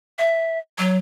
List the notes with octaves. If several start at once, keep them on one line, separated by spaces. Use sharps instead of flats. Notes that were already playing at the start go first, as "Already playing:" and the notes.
E5
F#3